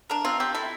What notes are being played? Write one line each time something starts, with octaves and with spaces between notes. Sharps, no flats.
D4 A#4
C4 F4
C4 G4
E4 A4